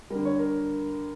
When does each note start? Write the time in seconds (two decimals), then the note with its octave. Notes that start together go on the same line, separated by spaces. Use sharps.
0.10 D3 G3 A#4
0.25 C#5
0.39 A#4